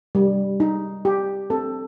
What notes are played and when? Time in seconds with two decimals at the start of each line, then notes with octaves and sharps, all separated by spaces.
0.15 G3
0.60 D#4
1.05 G4
1.50 C4 A4